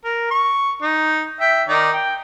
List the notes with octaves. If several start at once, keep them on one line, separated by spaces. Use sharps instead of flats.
A#4
C#6
D#4
E5 G5
D#3 D#4 D5
G5